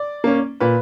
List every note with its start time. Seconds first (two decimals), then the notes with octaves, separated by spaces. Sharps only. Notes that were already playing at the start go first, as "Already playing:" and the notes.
Already playing: D5
0.24 A#3 C#4
0.60 A#2 B4